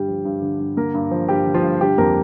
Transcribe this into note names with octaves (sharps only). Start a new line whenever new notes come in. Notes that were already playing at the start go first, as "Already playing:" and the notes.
Already playing: G2 D3 G3 G4
F3
G2
D3
G2
D3 A#3 A#4
G2
F3
G2 G3 G4
D3
F3 F4
G2
D3 G3 G4
F2 A#3 A#4